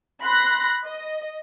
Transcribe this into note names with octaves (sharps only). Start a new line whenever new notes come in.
B5 C6 F#6 A#6
D#5